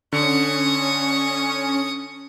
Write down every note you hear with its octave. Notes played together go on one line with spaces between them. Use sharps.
D3 C#4 C#6 D#6